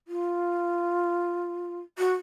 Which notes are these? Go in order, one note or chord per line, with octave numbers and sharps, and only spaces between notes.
F4
F#4